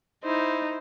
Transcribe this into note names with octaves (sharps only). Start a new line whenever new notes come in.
D#4 E4 C5